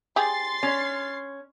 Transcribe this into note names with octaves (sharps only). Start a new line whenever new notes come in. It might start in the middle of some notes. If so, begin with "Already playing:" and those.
G4 G#4 C6 A6 C7
C#4